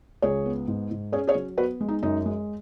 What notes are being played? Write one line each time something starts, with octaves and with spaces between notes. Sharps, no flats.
C#2 G#4 C#5
B3
G#2
G#2
C#4 G#4 C#5
G#4 C#5
F#3
B3 F#4 B4
G#3
D#4
F#2 D#4
G#3